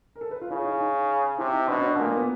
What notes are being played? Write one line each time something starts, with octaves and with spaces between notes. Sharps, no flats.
A#4
A4
B4
F4
C#3 E4
D#4
D#4
C3 E4
D#4
B2 D4
C#4
D4
A#2 A3
A#3
B3